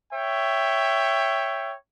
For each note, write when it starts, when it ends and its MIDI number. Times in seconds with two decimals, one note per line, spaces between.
0.13 1.74 73
0.13 1.74 76
0.13 1.74 79